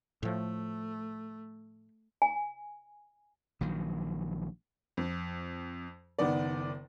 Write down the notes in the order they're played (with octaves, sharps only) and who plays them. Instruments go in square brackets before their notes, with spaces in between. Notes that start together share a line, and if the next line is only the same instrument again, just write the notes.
[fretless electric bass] A2 F3 [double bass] A3
[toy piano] G#5
[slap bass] A#1 D#3 F#3
[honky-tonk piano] F2
F#1 D#3 B3 D5